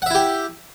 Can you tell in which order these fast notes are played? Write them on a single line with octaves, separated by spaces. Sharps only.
F#5 E5 E4 G4